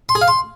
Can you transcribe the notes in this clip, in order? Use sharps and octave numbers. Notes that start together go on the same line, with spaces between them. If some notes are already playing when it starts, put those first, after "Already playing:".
C6
G#4
F5
C6